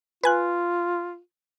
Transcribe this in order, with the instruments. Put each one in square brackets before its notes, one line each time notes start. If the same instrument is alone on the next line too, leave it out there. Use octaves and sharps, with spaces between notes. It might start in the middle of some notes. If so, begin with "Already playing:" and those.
[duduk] F4 [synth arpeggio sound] B4 G#5 F#6